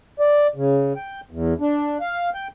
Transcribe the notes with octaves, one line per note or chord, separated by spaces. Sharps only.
D5
C#3
G5
E2
D4
F5
G5